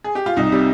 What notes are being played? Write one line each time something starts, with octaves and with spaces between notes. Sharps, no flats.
G#4
G4
F4
C2 D#4
C3 G3